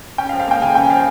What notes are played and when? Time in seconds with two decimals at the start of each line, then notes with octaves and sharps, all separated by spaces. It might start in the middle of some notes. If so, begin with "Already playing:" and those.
0.18 C#4 G5
0.29 F5
0.33 F3
0.40 F5
0.48 A#3 G5
0.62 C#3 G#5
0.75 C#4 G5
0.90 F3 F5